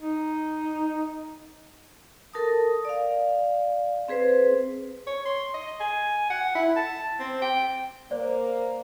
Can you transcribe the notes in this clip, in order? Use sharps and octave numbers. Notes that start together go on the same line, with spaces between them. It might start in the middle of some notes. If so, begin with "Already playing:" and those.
D#4
A4 A#4 A5 D#6
D5 F5
C4 G#4 B4 C5
C#5
C6
D#5
G#5
F#5
E4
A5
C4
G5
A#3 C5 D5